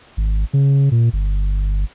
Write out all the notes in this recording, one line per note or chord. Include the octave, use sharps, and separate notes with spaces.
G#1
C#3
A#2
G1